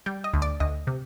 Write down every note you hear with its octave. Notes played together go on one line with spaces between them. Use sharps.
G3 G5
D#5
D2
D5
D2 D#5
C3